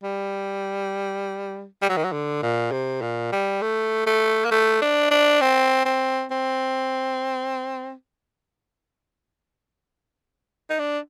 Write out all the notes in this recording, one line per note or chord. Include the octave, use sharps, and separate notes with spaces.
G3
G3
F#3
D#3
F#3
D3
A#2
C3
A#2
G3
A3
A3
A#3
A3
D4
D4
C4
C4
C4
D#4
D4